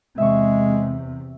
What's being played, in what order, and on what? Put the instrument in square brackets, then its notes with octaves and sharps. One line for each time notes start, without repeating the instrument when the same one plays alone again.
[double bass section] E2 C3 [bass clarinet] G#3 [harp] E5 C#6